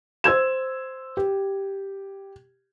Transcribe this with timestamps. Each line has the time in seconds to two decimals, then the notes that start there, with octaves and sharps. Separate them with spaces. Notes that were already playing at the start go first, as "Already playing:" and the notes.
0.24 C5 E6 G#6 E7
1.17 G4